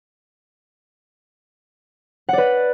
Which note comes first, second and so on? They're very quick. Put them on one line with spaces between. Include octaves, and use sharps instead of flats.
F#5 D5 B4